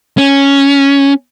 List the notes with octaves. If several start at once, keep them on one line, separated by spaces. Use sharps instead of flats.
C#4